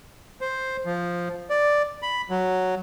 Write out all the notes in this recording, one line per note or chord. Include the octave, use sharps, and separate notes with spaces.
C5
F3
D5
B5
F#3